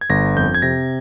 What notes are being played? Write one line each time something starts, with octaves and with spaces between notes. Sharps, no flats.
G#6
G1 A#6
F2 G6
G#6
C3 A#6